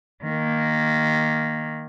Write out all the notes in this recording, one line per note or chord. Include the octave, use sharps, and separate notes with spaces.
D#3 A#3